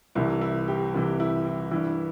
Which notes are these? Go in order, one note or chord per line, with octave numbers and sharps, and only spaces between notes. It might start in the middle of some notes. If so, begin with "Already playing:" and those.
C2 C3 E3 E4
E4
G4
C2 C3 E3
E4
E4
G2 E3 E4